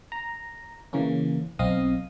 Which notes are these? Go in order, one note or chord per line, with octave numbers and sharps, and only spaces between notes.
A#5
C#3 E3 A#3 C#4
B1 C4 D#5 F5 D#6